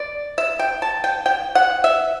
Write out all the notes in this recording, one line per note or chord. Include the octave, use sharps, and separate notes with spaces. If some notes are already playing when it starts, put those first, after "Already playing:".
Already playing: D5
E5
G5
A5
G5
G5
F#5
E5